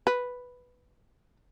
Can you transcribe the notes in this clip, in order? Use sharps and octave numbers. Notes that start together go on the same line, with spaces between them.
B4